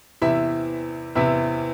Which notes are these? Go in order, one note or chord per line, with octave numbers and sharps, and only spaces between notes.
E2 C3 E3 E4 E5
E2 C3 E3 E4 E5